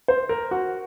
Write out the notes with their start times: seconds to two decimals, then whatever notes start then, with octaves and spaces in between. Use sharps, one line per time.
0.08 C5
0.29 A#4
0.51 F#4